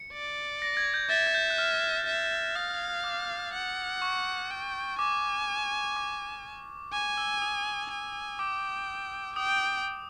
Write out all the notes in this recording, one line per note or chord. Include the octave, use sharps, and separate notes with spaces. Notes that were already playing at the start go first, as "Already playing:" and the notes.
Already playing: C#7
D5
A#6
G#6
G6
E5 A6
G#6
G6
F#6
F6
E5
F5 D#6
D6
F#5
C#6
G5
G#5 D6
D6
G#5 D6
E6
D#6
G#5
G5 D6
G5 D#6